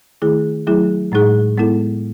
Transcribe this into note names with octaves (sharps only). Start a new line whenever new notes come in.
D#3 A3 E4 G#4
F#3 A3 E4 G#4
A2 G#3 D#4 G#4
G#3 B3 E4 A4